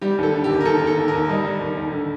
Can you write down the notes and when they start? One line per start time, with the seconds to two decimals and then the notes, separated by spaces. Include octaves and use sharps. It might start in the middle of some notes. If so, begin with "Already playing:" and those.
0.02 G3 G4
0.18 D#2 A4
0.34 D3
0.44 G4
0.50 D#2
0.61 A#4
0.65 D#2 A4
0.82 D#2
0.87 A4
0.97 D#2
1.08 A#4
1.13 D#2
1.29 G3 D#5
1.45 G3
1.61 D#2
1.77 D#2
1.92 D3